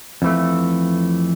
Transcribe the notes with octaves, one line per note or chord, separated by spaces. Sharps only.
F2 E3 A3